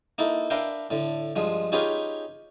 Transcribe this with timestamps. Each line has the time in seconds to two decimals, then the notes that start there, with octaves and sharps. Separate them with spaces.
0.18 A#3 D#4 E4 A4
0.50 D4 A#4 B4 E5 F5 G5
0.90 A2 D3
1.36 G2 F3 G#3
1.72 C#4 D#4 F4 G4 G#4 B4